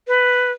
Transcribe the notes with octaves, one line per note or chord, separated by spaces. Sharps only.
B4